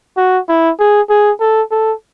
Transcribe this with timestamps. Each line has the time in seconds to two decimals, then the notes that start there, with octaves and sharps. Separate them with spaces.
0.17 F#4
0.49 E4
0.80 G#4
1.10 G#4
1.40 A4
1.71 A4